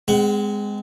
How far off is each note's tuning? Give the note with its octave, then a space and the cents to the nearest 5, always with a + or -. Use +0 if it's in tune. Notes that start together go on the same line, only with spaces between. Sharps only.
G#3 -5 C4 -35 F#5 +20